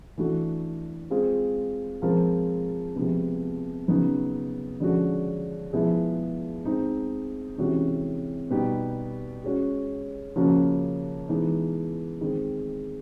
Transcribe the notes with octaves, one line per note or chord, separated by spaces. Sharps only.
E3 A3 D4 F#4
G#3 C4 F4 G#4
F3 G#3 C4 F4 A#4
C3 F3 G#3 B3
C#3 F#3 B3 D#4
D3 F3 G#3 C#4 F#4
F3 G#3 B3 E4 G#4
G#3 C4 D#4
C3 E3 G#3 C#4 F#4
B2 G3 B3 D#4 G4
G#3 C#4 F#4
C#3 F3 A#3 C#4 F#4
E3 G#3 B3 D#4
D#3 G#3 C4